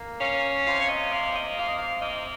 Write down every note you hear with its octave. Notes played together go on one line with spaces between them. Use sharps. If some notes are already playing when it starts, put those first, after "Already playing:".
Already playing: A#3
C#4 F5
C3 F5
C#5
D#5
A#3 F5
D#5
C3 F5
D#5
F5
A#3 D#5